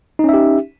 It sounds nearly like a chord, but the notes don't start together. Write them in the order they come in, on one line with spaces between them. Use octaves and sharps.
D#4 C#4 E5 G4